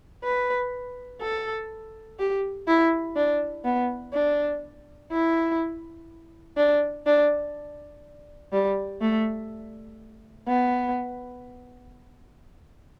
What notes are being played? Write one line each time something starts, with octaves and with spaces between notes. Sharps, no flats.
B4
A4
G4
E4
D4
B3
D4
E4
D4
D4
G3
A3
B3